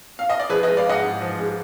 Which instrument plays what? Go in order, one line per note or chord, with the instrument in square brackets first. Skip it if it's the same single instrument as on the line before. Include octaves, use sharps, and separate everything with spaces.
[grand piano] F5
D#5
D5
F3 G#4 B4
B4 D#5
G#3
D5 F5
G#2 D#5 F#5
G#2
F3
G#3